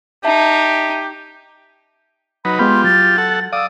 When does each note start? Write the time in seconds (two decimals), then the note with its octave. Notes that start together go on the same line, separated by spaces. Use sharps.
0.25 D#4 G4 E5 A5
2.45 F#3 D#4 B4 B5
2.59 G#3 B3 F4 G4 B5 C6
2.84 F#3 A6
3.18 A4 F#5
3.53 D5 F5 D#6 E6